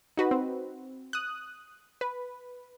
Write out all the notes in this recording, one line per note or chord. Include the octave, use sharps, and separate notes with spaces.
D#4 F#4 B4
C4
D#6 F#6
B4